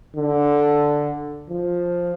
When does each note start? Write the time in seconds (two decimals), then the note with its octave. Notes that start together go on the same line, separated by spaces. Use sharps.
0.16 D3
1.50 F3